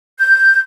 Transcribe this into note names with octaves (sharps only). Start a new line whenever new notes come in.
G6